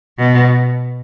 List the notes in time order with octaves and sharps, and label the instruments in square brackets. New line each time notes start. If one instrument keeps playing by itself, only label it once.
[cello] B2